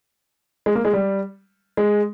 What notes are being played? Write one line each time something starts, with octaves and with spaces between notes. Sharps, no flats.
G#3
A#3
G#3
G3
G#3